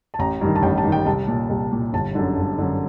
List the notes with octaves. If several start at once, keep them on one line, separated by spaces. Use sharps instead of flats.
A5
A1 A#5
G2 D#3
A5
A1 G5
A5
G2 D#3
G5
C2 A5
A#2
C2
A#2
G1 A5
F#2 D3
G1
F#2 D3